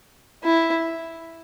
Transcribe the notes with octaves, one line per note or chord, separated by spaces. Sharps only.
E4